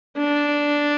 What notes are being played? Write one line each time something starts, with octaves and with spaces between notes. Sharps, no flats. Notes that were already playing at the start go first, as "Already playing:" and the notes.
D4